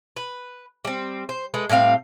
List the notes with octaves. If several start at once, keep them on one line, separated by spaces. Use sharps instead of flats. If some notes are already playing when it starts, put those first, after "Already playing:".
B4
G3 C4
C5
G#3 A3 B4
A2 G3 C4 F5